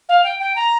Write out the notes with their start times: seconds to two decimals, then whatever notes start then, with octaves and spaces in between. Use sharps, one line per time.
0.09 F5
0.24 G5
0.40 G5
0.55 A#5